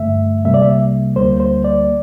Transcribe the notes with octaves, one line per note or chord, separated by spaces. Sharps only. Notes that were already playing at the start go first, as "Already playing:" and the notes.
Already playing: G2 D3 A3 E5
C2 C3 G3 A#3 E5
D5
E5
D2 D3 G3 A#3 C5
C5
D5